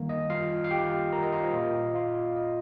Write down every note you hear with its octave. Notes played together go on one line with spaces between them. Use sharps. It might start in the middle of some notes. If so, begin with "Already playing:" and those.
Already playing: D#3 G3 A#3
D#5
F4 F5
F5
G4 G5
A#4 A#5
D#5
F4 F5
C5
A#2 A#3 F4 D#5
F4 F5
D#5